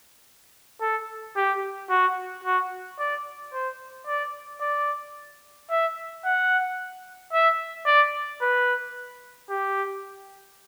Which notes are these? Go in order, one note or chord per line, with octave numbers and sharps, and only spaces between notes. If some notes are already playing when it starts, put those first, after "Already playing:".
A4
G4
F#4
F#4
D5
C5
D5
D5
E5
F#5
E5
D5
B4
G4